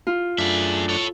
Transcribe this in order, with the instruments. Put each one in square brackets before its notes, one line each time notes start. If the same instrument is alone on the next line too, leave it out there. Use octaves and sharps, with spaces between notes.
[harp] F4
[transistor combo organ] F#2 A3 D4 [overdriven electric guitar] G#4 E5
[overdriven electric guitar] A4 C#5